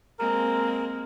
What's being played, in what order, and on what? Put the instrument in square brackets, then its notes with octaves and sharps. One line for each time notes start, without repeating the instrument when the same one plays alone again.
[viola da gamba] G#3 A#3 C4 [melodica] A#4